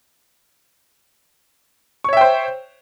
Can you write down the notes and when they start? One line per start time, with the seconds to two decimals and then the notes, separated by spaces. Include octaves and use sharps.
2.04 C#6
2.09 C#5
2.13 E5
2.17 G5
2.21 C5